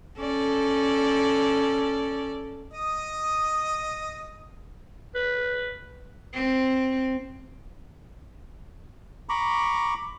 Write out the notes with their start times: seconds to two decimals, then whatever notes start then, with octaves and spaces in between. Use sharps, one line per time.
0.19 C#4 A4 D5
2.72 D#5 D#6
5.15 B4
6.34 C4
9.29 A#5 B5 C#6 D6